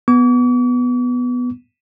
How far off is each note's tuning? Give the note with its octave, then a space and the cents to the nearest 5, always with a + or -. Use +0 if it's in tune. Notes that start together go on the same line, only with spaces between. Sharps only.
B3 +0 D6 -45